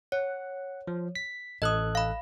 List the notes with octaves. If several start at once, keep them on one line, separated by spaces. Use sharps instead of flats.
C#5 F#5
F3
B6
A1 A4 D#5 D#6 F#6
F5 B5